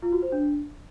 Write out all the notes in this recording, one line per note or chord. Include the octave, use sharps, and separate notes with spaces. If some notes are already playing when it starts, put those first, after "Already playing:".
F4
F#4
C5
D4